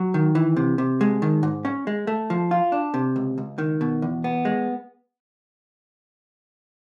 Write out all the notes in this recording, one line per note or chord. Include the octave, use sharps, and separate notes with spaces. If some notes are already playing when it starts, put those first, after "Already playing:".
Already playing: F#3
D#3
E3
C3
C3
G#3
D#3
G#2
C#4
G#3
A3
F3
F4
D4
C3
C#2
C#2
D#3
B2
E2
B3
G#3